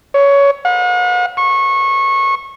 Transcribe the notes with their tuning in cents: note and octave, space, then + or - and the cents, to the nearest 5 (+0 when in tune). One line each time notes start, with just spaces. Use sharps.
C#5 +15
F#5 -45
C#6 -25